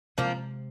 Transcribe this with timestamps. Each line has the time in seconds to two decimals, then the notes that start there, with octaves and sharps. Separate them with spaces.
0.18 C3 F3 G#3 A#3 C4